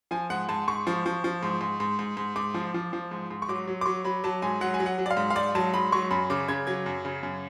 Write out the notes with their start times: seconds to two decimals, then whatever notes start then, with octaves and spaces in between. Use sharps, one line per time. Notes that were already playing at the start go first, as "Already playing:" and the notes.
0.11 F3 G#5
0.30 G#2 F#5
0.49 G#2 A5
0.68 G#2 C#6
0.87 F3
1.06 F3
1.24 F3
1.43 G#2
1.61 G#2
1.80 G#2
1.99 G#2
2.17 G#2
2.36 G#2 D6
2.54 F3
2.74 F3
2.93 F3
3.11 G#2
3.31 G#2
3.42 C#6
3.48 F#3 D6
3.67 F#3
3.81 D6
3.86 F#3 C#6
4.04 F#3 B5
4.24 F#3 A5
4.42 G#2 G#5
4.61 F#3 F#5
4.74 G#5
4.80 F#3
4.86 F#5
4.98 F#3
5.06 D5
5.11 F5
5.17 G#2
5.30 F5
5.36 G#2 D5
5.55 F#3 A5
5.74 G#2 B5
5.92 F#3 C#6
6.11 F#2 B5
6.30 C#3 D6
6.48 C#3 G#6
6.67 F#3 G#6
6.86 F#2
7.05 C#3
7.23 F#2